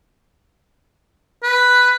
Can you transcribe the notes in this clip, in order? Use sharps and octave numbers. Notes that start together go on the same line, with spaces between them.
B4